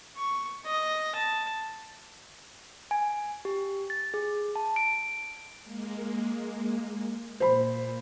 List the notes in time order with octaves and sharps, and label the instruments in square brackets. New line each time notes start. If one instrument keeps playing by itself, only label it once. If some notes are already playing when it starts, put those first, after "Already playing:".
[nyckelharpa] C#6
D#5
A5
[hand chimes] G#5
G4
A6
G#4
A5
D7
[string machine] G#3 A#3
[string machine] A#2 [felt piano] C5 B5